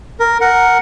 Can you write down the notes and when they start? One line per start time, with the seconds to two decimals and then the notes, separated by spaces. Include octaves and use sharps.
0.20 A#4
0.41 A#4 F#5